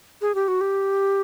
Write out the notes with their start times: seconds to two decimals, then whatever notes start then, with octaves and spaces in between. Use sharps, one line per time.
0.21 G#4
0.35 G4
0.48 F#4
0.61 G4